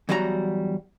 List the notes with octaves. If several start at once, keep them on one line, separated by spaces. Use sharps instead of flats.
E2 F#3 G3 F#4 D#5 A#5